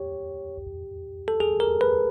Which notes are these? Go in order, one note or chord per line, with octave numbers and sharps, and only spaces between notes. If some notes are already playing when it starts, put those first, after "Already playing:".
Already playing: G4 C#5
A4
G#4
A#4
B4